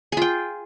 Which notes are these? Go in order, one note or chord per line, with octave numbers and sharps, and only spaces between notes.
F4 G#4 G5